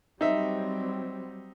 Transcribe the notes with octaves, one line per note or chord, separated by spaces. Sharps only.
F#3 G3 C4 D#4 E5